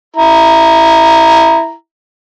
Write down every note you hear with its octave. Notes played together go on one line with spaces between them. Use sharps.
E4 A#5